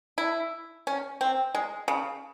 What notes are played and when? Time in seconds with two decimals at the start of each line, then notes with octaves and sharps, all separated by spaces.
0.18 E4
0.87 C#4
1.21 C4
1.55 G#3
1.88 C#3